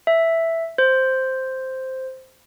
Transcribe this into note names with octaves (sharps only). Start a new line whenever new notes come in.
E5
C5